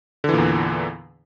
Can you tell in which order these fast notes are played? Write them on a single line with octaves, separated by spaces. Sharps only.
D3 E3 A#2 E2